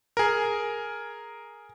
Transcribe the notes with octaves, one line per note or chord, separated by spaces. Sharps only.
G#4 A#4